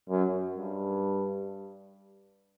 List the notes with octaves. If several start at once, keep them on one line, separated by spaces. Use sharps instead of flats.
F#2
G2